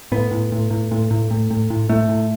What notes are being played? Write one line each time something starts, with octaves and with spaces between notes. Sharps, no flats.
A2 B3
A2
A2
A2
A2
A2
A2
A2
A2
A2 A3
A2